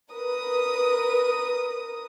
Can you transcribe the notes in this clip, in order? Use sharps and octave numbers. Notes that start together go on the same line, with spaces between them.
A#4 B4 D#6